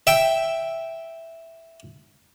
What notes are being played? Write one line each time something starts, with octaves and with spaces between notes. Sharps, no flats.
E5 G5